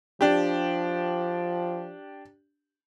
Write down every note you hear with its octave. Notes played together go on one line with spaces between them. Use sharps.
F3 D4 G4